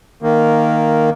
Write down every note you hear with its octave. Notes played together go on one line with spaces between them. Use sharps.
D#3 A#3